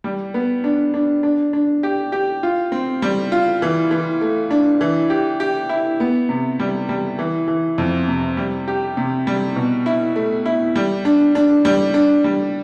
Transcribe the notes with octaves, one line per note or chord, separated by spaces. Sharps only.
G3
B3
D4
D4
D4
D4
G4
G4
F4
C4
G3
F4
E3
E3
A3
D4
E3
G4
G4
E4
B3
C3
G3
G3
E3
E3
F2
C3
G3
G4
C3
G3
B2
E4
A3
E4
G3
D4
D4
G3
D4
G3